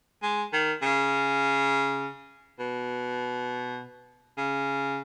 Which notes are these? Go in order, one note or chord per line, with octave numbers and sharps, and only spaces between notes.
G#3
D#3
C#3
B2
C#3